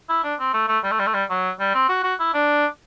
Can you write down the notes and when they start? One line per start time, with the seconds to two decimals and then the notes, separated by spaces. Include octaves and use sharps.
0.09 E4
0.24 D4
0.39 C4
0.54 A3
0.68 A3
0.83 G3
0.91 A3
0.99 G3
1.07 A3
1.14 G3
1.30 F#3
1.60 G3
1.74 C4
1.89 F#4
2.04 F#4
2.19 E4
2.34 D4